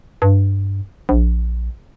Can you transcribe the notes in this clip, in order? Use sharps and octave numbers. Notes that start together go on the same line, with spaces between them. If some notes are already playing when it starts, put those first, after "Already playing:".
G2
A#1